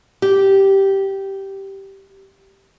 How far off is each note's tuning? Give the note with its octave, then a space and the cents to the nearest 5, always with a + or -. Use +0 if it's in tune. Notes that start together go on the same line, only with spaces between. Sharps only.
G4 -10